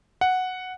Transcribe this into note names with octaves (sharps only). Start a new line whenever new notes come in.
F#5